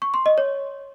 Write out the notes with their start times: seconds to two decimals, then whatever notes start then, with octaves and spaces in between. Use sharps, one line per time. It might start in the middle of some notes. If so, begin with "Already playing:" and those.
0.02 C#6
0.14 C6
0.26 D#5
0.38 C#5